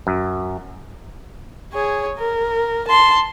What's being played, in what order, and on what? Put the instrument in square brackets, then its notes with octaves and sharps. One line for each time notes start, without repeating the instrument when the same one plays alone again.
[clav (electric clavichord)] F#2
[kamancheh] G#4 C#5
A#4
A5 C6